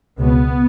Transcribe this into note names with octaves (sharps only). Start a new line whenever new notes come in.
C#2 B2 B3